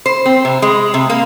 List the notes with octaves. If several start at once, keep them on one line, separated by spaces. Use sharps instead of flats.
C5
C4
C3
G#3
C3
A#3